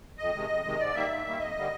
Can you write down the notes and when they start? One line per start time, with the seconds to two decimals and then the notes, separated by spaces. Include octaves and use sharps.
0.18 F2 D#5
0.34 C3 D#3 G#3
0.49 F2
0.65 C3 D#3 G#3
0.79 G#2 D5
0.95 D#3 G3 A#3 E5
1.10 G#2
1.25 D#3 G3 A#3
1.40 F2 D#5
1.56 D3 G3 A#3